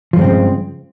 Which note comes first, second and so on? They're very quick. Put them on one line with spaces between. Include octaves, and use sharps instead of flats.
F3 G2 G#3 C4 C#3